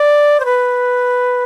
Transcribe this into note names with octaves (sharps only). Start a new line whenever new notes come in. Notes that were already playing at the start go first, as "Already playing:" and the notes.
Already playing: D5
C5
B4